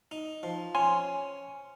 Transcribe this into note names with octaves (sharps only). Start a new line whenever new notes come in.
D#4
F3
C#4 G#5 C6